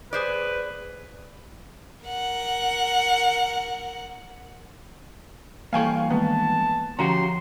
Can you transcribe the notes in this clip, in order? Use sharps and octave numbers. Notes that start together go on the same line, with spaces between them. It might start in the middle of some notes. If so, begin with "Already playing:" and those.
G#4 B4 C5 D5
A#4 F#5
G2 E3 A#3 A4 F5 G5 G#5 C#6
D#3 G#3 A#3 B3 A5
D3 F3 C#4 F#4 G4 A#5 C6